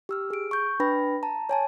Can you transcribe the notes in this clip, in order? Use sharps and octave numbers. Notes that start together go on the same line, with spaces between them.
G4 E6 F6
G#4 D7
C#6 G6
D4 B4 G5 B5 A#6
A5 A#5
C#5 G#5 A5